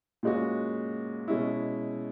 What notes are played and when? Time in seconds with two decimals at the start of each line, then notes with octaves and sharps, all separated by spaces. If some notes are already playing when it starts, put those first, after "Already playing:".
0.23 A#2 G#3 C#4 F#4
1.28 B2 G#3 C#4 E4